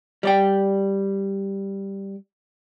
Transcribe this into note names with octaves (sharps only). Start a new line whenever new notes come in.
G3 D5 G5